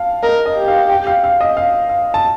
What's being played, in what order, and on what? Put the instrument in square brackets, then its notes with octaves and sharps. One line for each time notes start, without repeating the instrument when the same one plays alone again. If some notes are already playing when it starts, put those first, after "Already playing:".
Already playing: [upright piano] F5 A5
[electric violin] A#4 [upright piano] D#5
[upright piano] D#5
[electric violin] G4
[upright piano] F5
G5
F5
F5
D#5
F5
F5
A5